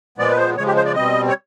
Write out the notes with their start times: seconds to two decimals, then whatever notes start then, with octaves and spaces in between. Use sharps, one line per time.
0.18 A#2 F3 G#3 B3 D5
0.31 B4
0.37 C5
0.57 C#3 F3 G#3 C#5
0.66 G4
0.76 C5
0.86 D5
0.95 B2 G3 C4 D#5
1.29 C#5